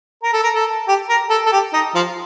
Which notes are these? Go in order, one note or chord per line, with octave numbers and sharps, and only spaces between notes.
A#4
A4
A#4
A4
G4
A#4
A4
A4
G4
D#4
F3